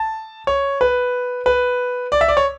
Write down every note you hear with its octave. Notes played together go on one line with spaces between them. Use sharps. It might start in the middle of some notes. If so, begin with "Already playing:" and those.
Already playing: A5
C#5
B4
B4
D5
E5
D5
C#5